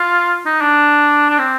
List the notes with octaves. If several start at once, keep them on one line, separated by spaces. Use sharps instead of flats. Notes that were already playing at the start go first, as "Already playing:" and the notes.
Already playing: F4
D#4
D4
D4
C4